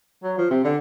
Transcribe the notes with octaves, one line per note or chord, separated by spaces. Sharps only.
F#3
F3
C3
D3